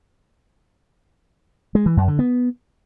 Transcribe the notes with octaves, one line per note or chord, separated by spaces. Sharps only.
G#3
E3
F#2
D3
B3